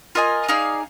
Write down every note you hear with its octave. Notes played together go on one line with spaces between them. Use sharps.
F4 A#4 D#5 G#5
D#4 G#4 D5 F5